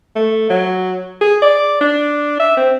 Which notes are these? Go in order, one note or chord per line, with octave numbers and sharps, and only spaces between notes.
A3
F#3
G#4
D5
D4
E5
C4